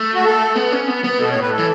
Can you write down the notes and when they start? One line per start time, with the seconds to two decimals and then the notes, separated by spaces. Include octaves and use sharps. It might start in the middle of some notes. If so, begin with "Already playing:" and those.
Already playing: A3
0.14 F#4
0.24 A4
0.55 B3
0.72 C#4
0.88 B3
1.04 B3
1.19 B2 A4
1.30 C#5
1.35 A2
1.41 B4
1.52 A4
1.59 E3